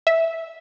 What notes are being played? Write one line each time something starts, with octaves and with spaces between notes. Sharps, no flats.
E5